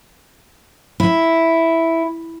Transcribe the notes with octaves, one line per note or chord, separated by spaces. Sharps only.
E4